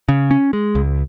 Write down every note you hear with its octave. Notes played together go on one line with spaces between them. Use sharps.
C#3
C#4
G#3
C#2